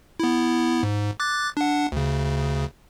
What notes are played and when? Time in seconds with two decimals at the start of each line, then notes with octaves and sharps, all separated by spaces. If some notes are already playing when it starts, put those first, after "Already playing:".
0.20 B3 E4
0.83 G#2
1.20 D6 F#6 A6
1.57 D4 F#5
1.92 D2 C#3